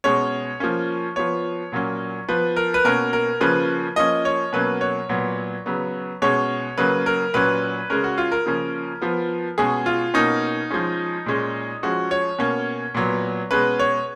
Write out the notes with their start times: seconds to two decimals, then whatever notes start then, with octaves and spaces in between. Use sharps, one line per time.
0.04 B2 G#3 C#4 C#5
0.60 F3 A#3 C#4
1.16 F3 B3 C#5
1.72 A#2 F#3 A#3 C#4
2.28 F3 B3 B4
2.56 A#4
2.74 B4
2.85 B2 A#3 C#4 A#4
3.13 A#4
3.40 C#3 F3 A#3 C#4 B4
3.96 F3 A#3 C#4 D#5
4.25 C#5
4.53 B2 F#3 A#3 C#4 B4
4.81 C#5
5.09 A#2 F#3 B3
5.66 C#3 F#3 B3
6.22 B2 G#3 C#4 C#5
6.78 C#3 F#3 A#3 C#4 B4
7.06 A#4
7.34 A#2 F#3 C#4 B4
7.90 C#3 G#3 C#4 A#4
8.04 F#4
8.18 F4
8.32 A#4
8.46 C#3 F3 A#3 C#4
9.01 F3 B3
9.58 B2 G#3 C#4 G#4
9.86 F4
10.14 B2 A#3 C#4 D#4
10.71 F3 G#3 C#4
11.26 A#2 G#3 C#4
11.83 F3 G#3 C#4 F#4
12.11 C#5
12.39 B2 A#3 C#4
12.94 A#2 F#3 B3
13.51 B2 G#3 C#4 B4
13.79 C#5